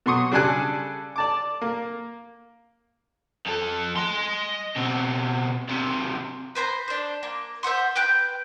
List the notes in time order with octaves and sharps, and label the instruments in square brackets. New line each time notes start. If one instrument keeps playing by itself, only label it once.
[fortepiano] B2 F#3 C6 C#6 D#6
C#3 G3 D4 A4 G#5 F#6
D5 A5 D6
A#3
[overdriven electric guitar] F2 A4
D#5 C6
B2 C4
D#2 C3
[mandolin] B4 C5 G#5 A#5
D4 C5
A#3
C5 E5 F#5 C6
B4 G5 F#6 G6